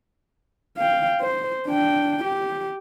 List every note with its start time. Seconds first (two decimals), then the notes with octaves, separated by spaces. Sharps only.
0.77 F5 G5
1.21 C5
1.68 D4 G5
2.24 G4